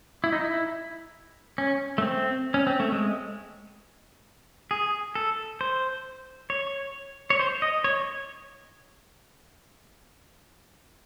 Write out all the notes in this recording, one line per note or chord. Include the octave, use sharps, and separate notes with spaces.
E4
D#4
E4
C#4
A3
C4
C#4
C4
A3
G#3
G#4
A4
C5
C#5
C#5
C5
D#5
C#5